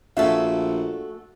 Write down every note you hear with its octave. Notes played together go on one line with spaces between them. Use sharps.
A#1 A3 F#4 G#4 A4 E5 F5